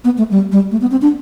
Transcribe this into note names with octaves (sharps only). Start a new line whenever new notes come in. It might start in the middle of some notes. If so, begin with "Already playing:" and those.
B3
A3
G3
G3
A3
B3
C4
D4